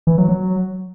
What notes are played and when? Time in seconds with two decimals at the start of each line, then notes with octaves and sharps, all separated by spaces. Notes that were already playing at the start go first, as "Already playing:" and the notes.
0.07 E3
0.18 F#3
0.29 F#3